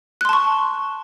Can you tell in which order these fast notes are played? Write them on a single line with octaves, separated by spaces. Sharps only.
F#6 C6 A5 C#6